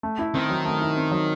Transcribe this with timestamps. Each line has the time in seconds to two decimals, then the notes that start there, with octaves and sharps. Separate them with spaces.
0.03 A3
0.19 E4
0.34 D#3 C4
0.50 F#3
0.65 A3
0.81 E4
0.96 C4
1.11 F#3